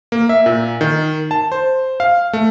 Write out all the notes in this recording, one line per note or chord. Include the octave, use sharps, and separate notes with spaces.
A#3
E5
A#2
D#3
A5
C5
F5
A3